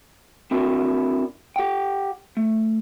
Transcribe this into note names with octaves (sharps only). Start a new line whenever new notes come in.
C4 D4 E4 F#4 A#4
G4 F#5 G5
A3